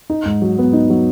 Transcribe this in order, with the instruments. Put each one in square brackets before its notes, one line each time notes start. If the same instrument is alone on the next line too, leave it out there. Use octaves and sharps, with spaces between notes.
[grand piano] D#4
G#2
F#3
B3
D#4
F#3